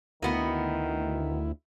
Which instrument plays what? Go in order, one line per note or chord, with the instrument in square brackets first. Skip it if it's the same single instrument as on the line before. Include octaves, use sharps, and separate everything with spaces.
[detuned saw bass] D2 [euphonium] D#3 [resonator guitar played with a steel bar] A#3 B3 F#4 [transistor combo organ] E4